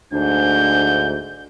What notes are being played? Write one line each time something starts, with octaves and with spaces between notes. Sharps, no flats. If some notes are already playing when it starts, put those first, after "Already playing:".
D2 G#2 D4 G6